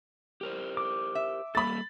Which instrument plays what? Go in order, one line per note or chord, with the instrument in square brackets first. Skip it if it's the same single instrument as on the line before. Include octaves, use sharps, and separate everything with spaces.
[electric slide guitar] G4 A#4 C5
[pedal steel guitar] D6
[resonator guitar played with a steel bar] E5
[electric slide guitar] G3 A#3 A4 [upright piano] B5 A6